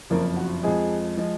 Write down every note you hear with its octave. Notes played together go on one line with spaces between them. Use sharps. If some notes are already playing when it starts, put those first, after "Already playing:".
F#1 F2 F3 A#4
F#4
F2 F3 G#3 G#4
F3 G#3